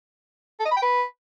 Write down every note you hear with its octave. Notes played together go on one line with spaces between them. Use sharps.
A4
D#5
B5
G5
B4